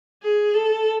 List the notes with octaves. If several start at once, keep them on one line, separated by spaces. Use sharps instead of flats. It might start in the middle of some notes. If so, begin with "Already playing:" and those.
G#4
A4